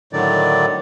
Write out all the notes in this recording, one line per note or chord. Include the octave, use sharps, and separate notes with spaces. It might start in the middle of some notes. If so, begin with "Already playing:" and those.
A2 D3 D#3 F#3 D5